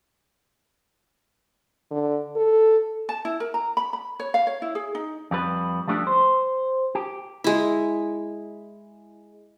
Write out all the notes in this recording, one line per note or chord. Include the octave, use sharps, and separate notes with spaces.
D3
A4
A5
E4
A#4
A#5
B5
B5
C#5
F5
C#5
E4
G#4
D#4
F2 G3 B4
F3 G3 A3 D4 G4
C5
G4
G#3 E4